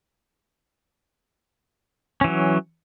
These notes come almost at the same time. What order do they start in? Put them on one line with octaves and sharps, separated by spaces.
C#4 E3 F#3